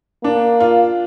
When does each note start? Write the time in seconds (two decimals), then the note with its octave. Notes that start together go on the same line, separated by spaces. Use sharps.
0.23 A#3 D4
0.60 F4